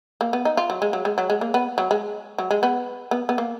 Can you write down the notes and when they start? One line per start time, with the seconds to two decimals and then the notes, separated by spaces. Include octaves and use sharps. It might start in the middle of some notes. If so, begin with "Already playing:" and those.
0.21 A#3
0.33 B3
0.45 D#4
0.57 F4
0.70 F#3
0.82 G#3
0.93 F#3
1.05 G#3
1.18 F#3
1.30 G#3
1.41 A#3
1.54 B3
1.78 F#3
1.91 G#3
2.38 F#3
2.51 G#3
2.63 B3
3.11 B3
3.29 B3
3.38 A#3